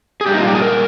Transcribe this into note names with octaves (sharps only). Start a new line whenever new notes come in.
G#4
A#2 G3 D4 G4
D#4
F4
G4
G#4
A#4